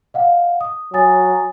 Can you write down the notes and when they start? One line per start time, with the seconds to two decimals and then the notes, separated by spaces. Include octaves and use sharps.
0.14 D#5 F5 F#5
0.61 D#6
0.94 F#3 G#5 D#6 A6